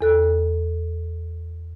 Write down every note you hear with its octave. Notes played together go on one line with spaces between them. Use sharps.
E2 A4 F#6